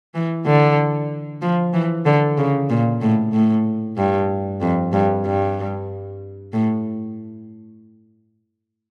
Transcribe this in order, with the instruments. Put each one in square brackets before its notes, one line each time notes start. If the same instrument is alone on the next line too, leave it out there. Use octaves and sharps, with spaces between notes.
[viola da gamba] E3
D3
F3
E3
D3
C#3
A#2
A2
A2
G2
F2
G2
G2
A2